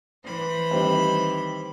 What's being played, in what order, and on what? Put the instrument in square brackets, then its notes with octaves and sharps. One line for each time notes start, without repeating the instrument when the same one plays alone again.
[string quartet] E3 C5 B5
[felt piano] D#3 G3 C4